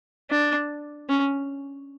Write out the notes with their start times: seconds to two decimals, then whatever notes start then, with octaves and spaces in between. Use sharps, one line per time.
0.30 D4
1.09 C#4